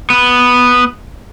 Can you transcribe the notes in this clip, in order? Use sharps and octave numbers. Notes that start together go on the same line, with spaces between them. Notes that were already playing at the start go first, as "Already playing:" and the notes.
B3